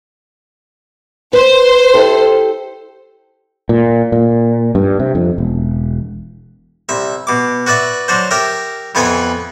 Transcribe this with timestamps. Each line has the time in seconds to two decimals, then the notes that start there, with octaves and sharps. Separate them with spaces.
1.33 B4 C5
1.94 E4 G4 A4
3.69 A#2
4.12 A#2
4.75 G2
5.00 C3
5.15 F2
5.38 E1
6.89 C2 E5
7.27 B2 D6
7.66 F#4 B4 D5 E5
8.08 F#3 D4 F#4 C5
8.31 G4 A#4 E5
8.95 F2 E3 B3 B4 F#5 G#5